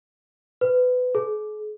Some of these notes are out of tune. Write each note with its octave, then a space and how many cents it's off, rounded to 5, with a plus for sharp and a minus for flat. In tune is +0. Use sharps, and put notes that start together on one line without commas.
B4 +25
G#4 +40